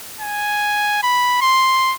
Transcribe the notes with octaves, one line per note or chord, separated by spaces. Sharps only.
G#5
B5
C6